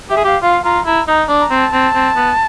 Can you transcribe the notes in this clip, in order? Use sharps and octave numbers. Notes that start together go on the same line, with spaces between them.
G4 E5
G#4
G4 F5
F4 F5
F4 A#5
E4 A#5
D#4 A#5
D4
A#5
C4
A5
C4
C4
B3